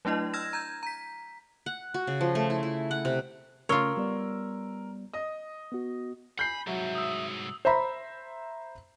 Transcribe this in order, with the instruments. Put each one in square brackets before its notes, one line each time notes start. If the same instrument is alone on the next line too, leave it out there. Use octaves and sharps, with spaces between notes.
[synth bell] F#3 A3 D4 E4 D#5
E6 F6 G#6 A#6 E7
A#5 G6 G#6
A#5 B6
[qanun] F#5
F#4
C#3
F3
A3
E4
E4
F#5
C3
[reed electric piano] C#3 A3 C#4 [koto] F4 C#5 [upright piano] A#4 E6 G7
[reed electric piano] G3 B3 D5
[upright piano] D#5 D#6
[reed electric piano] B3 F#4
[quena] G#5 [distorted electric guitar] B5 [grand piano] G6 C7
[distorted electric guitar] C2 G#2 [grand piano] F#3 [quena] E5
[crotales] D#6 E6
[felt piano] C5 E5 A#5 B5